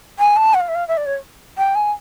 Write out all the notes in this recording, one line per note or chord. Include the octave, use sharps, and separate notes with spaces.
G#5
A5
F#5
F5
E5
F5
E5
D5
C#5
G5
G#5